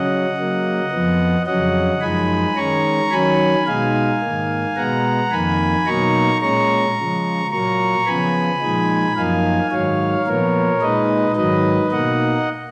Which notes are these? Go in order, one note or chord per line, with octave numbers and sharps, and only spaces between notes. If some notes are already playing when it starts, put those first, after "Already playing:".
Already playing: C#3 F#3 C#4 D#5 F#5
C#3 F#3 A#3
F2 F3 B3
F2 C#3 F#3 C#4 D#5 F#5
F#2 F3 G#3 D#4 G#5 B5
D#3 G#3 C#4 A#5 C#6
D#3 F#3 C#4 G#5 B5
B2 G#3 D#4 F5 G#5
G#2 D#3 A#3
B2 G#3 B3 F#5 A#5
F2 D#3 A#3 G#5 B5
B2 F#3 A#3 D#4 A#5 C#6
A#2 G#3 C#4 A#5 C#6
C#3 F3 G#3
A#2 F#3 A#3 A#5 C#6
C#3 F3 B3 G#5 B5
A#2 F3 G#3 D#4
F#2 F3 A#3 D#4 F5 G#5
G#2 D#3 F#3 C#5 F5
A#2 F3 B3 A#4 C#5
A#2 G#3 D#4 B4 D#5
G#2 D#3 F#3 B4 D#5
B2 A#3 D#4 D#5 F#5